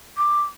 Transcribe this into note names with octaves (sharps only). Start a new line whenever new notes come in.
D6